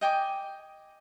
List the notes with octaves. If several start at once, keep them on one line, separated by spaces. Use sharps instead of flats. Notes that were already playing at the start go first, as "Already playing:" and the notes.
D#5 G5 G#5 D6